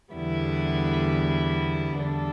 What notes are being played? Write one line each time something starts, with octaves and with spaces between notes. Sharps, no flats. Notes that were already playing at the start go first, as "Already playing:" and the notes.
E2 D3 G3 B3 E4
E2 D3 G3 D4 A4